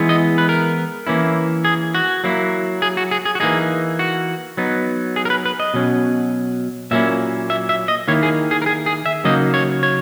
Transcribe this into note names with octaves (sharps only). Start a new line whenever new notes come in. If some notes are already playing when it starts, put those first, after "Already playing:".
Already playing: E3 G#3 B3 E4
D#5
B4
A#4
E3 A#3 C#4 E4
G#4
F#4
F#3 A#3 E4
G#4
F#4
G#4
G#4
F#4
E3 A#3 D#4 G#4
F#4
F#3 B3 D#4
G#4
A#4
B4
B4
D#5
B2 F#3 C#4
A#2 F#3 A#3 C#4 E4 E5
E5
E5
D#5
D#3 A#3 E4 C#5
G#4
G#4
A#4
G#4
G#4
E5
C#3 F#3 A#3 D#4 D#5
C#5
C#5